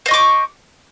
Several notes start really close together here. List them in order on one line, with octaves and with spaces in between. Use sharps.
C5 D#5 C#6 D6